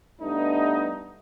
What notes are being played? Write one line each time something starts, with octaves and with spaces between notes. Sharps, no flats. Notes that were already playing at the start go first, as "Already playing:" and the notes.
G2 A3 B3 D4 D#4